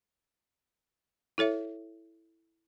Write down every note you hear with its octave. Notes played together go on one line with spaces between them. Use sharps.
E4 A4 C#5 E5